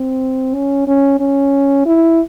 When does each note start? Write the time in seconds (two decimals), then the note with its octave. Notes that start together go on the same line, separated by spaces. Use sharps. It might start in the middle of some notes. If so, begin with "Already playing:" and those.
Already playing: C4
0.55 C#4
0.87 C#4
1.20 C#4
1.86 E4